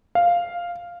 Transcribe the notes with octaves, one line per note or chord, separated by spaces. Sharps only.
F5